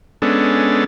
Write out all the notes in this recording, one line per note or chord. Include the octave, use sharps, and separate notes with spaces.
G#3 B3 C#4 D4 A4